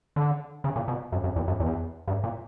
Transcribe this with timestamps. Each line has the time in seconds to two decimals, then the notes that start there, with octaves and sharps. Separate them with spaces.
0.16 D3
0.64 C#3
0.76 A#2
0.88 B2
1.12 F#2
1.24 F#2
1.36 E2
1.48 F#2
1.60 E2
2.07 G2
2.24 A#2